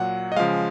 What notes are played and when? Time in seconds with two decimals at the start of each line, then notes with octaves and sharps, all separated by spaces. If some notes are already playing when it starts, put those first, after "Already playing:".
Already playing: A#2 F#3 F#5
0.32 D#5
0.36 C#3 F3 G#3 F5